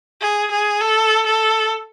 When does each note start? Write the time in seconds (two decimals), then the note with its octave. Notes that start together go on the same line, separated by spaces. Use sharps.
0.21 G#4
0.51 G#4
0.81 A4
1.26 A4